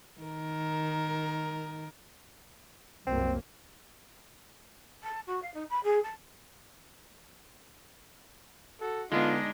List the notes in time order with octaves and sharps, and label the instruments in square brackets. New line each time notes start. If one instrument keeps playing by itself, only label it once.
[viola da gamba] D#3 A#4
[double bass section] C2 F#2 A#3 [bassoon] C4
[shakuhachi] A5
F#4
F5
D#4
B5
G#4
A5
[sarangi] F#4 [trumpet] A4
[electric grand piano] D3 B3 [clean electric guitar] G#3 D4 [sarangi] D#4 [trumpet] F4